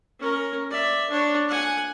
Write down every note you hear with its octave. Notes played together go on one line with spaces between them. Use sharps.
C#4 A#4
D5 E5
D4 C#5
F#5 G#5